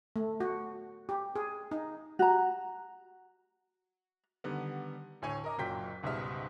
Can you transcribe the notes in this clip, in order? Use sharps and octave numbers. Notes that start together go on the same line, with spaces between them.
A3
F#4
G4
G#4
D#4
F#4 A#5
D3 D#3 G3 B3
D2 A2 C#5 G#5 C#6
A#4 D#5 D6
F#1 A#2 F#3 G5 G6 B6
C#2 G#2 B2 G3 E5 F6